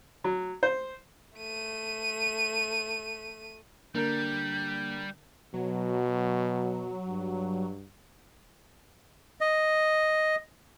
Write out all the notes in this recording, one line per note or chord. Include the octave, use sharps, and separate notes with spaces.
F#3
C5
A3 D#7
D3 G3 A#3 D4 A#4 G6
B2 F#3
G2
D#5